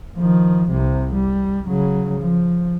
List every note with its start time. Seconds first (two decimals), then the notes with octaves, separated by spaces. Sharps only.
0.17 D#3 F3
0.71 C2 C3
1.15 G3
1.68 C#3 F#3
2.20 F3